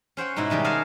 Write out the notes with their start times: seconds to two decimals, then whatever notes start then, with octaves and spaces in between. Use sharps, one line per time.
0.17 C#4 C5 F#5 G5
0.36 G#2 B2 D#4 E4 F#4
0.50 B2 D#3 G3 G#3
0.64 G#4 A#4 F5 F#5 G#5 A5